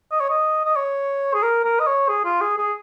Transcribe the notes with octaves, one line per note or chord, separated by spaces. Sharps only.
D#5
C#5
D#5
D#5
C#5
G#4
A#4
A#4
D#5
C#5
G#4
F4
G#4
G#4